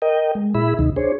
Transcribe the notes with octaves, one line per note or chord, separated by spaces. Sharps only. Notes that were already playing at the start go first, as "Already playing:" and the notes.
A#4 D#5 G5
G#3
A#2 E4 G#4 E5 B5
D2 C3 D#3 D#4
D4 G#4 C5 C#5